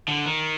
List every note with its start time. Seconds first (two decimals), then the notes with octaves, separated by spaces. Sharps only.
0.08 D3
0.26 D#3